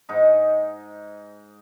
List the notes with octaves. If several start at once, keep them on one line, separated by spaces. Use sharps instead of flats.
G#2 D#4